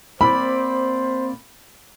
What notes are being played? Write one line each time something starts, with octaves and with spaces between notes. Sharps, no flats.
A#3 C4 C5 D5 B5